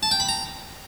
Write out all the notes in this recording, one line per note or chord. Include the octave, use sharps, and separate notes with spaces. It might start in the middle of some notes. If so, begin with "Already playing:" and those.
A5
G5
B5
A#5